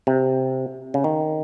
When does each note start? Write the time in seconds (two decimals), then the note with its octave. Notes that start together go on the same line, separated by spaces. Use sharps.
0.07 C3
0.94 C#3
1.04 D#3